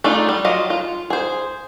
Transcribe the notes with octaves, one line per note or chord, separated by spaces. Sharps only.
A3 D4 D#4 F4
G3
F#3 F4 D#5
F4
G#4 C5